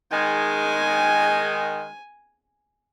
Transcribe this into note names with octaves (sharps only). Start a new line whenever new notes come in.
D#3 G#3 G#5